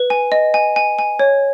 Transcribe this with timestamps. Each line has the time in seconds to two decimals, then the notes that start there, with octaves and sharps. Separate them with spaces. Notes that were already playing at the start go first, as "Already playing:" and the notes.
Already playing: B4
0.10 G#5
0.32 D#5
0.54 G#5
0.76 G#5
0.99 G#5
1.19 C#5